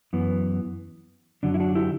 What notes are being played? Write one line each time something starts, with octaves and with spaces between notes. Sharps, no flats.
F#2 E3 B3
F#2 D3 F#3 D4
E4
D4 F#4
E4 G4